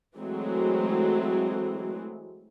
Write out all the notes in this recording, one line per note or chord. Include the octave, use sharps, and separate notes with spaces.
E3 F#3 G#3 A3 C4